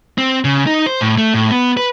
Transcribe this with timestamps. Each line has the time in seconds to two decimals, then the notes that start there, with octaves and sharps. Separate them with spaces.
0.18 C4
0.44 C#3
0.67 D#4
0.86 C5
1.01 A2
1.18 A3
1.34 A2
1.51 B3
1.77 B4